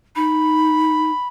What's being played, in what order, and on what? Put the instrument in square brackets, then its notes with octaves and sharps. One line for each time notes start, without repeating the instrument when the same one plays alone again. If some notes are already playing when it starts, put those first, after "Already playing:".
[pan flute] D#4 [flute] B5